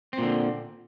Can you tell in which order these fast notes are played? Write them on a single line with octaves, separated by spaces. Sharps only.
C4 A#2 D3